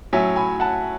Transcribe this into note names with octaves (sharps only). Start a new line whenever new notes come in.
A2 F#3 C#4 E5 G#5
G#5 B5
F#5 A5